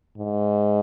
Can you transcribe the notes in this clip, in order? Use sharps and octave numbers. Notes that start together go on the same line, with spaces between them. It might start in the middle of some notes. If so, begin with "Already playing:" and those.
G#2